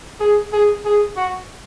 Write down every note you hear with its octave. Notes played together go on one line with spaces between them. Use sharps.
G#4
G#4
G#4
F#4